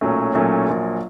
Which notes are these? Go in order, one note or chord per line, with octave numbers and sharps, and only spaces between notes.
B1 A#2 F#3 A3 C#4
B1 A#2 F#3 A3 C#4
A#1 A#2 F#3